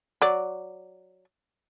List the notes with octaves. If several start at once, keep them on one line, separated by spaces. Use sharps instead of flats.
F#3 D5